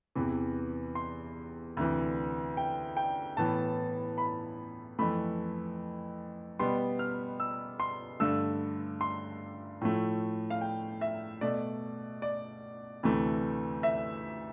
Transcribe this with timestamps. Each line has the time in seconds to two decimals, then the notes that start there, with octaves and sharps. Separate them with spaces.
0.15 E2 C3 E3
0.95 C6
1.77 D2 C3 E3
2.57 G5
2.97 G5
3.37 A2 E3 B3 A5
4.18 B5
4.99 F2 E3 A3 B5
6.59 B2 G3 B3 C6
6.99 F6
7.40 E6
7.80 C6
8.20 G2 D3 A3 E6
9.01 C6
9.81 A2 F3 A3
10.50 F5
10.61 G5
11.01 E5
11.41 B2 A3 D5
12.22 D5
13.03 D2 C3 E3 A3
13.83 E5